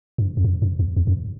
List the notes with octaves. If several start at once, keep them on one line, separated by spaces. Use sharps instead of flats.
G2
F2
F#2
F#2
E2
E2
F#2